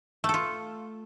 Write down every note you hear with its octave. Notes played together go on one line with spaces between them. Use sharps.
A3 F4 A4